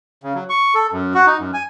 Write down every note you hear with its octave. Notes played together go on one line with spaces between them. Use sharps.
C#3
F#3
C#6
A4
F#2
F#4
D#4
F#2
G#5